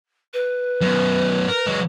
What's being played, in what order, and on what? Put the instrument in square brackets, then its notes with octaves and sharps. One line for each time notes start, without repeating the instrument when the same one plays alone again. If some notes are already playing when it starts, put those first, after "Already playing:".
[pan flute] B4
[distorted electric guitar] F#2 B2
A#4
F#3 G#3